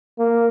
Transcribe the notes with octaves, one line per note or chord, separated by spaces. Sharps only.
A#3